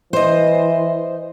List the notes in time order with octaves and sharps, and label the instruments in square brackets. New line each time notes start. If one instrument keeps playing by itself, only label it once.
[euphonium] E3 [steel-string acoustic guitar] C5 D#5